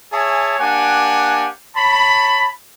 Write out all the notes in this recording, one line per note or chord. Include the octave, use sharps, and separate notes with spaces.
G#4 C#5 E5 G#5 A5
A#3 D4 G4 F#5 G#5
C#5 A5 B5